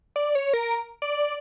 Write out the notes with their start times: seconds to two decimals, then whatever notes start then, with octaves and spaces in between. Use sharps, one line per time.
0.16 D5
0.35 C#5
0.54 A#4
1.02 D5